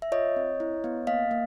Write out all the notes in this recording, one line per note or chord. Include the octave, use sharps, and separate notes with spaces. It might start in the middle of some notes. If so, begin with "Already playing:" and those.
E5
F4 C#5 D#5
C4
E4
B3
A#3 D#5 F5
A#3